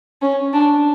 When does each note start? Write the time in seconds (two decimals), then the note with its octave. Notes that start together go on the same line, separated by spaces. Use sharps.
0.22 C#4
0.53 D4